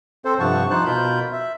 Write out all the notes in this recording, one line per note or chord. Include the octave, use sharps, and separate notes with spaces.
C4 A4 C5
G2 C3 F3 F#5 A5 C#6
F3 D#4 C5 A5 F#6
B2 F4 A#4 B5 G6
E5